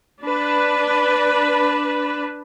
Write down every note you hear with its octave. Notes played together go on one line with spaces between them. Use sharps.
D4 B4